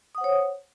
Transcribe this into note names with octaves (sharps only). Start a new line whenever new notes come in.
C5 C#5 F#5 D#6